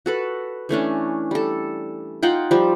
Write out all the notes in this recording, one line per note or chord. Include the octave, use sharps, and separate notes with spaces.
F#4 A4 B4
E3 A3 C#4 D4
G3 A4
D#4 F4 F#5 G5
F3 G3